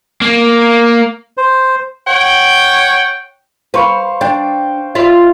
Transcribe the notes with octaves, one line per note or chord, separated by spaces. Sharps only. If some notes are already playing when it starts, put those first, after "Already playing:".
A#3
C5
C#5 F#5 G5
B4 C5 F5 C#6
D4 G5
F4 D5 E5